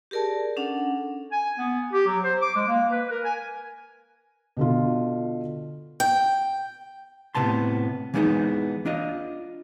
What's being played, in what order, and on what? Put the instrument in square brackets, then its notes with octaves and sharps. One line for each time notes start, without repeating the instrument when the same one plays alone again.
[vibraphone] G4 G#4 A#4 D5 A5
C#4 D4 A4 F#5
[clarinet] G#5
B3
G4
F#3
C5
D6
G#3
A#3
B4
A#4
G#5
[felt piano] B2 D3 F4
[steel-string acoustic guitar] G5
[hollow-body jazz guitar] A2 C3 B3 A5 C6
E3 G#3 A3 B3 D#4 G#4
D4 F4 D#5